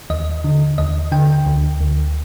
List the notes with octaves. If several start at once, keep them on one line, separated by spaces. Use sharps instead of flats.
D#2 D#5
D3
D#2 D#5
D3 G5
D2
D2